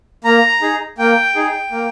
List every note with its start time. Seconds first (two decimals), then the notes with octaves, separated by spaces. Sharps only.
0.24 A#3 A#5
0.61 D#4 G#4
0.98 A#3 G5
1.35 D#4 G#4
1.72 A#3